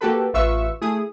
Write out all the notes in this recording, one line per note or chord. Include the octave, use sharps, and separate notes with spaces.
A#3 F#4 G4 A4 B4
A1 F4 B4 E5 C#6 E6
A3 E4 G#4 D#6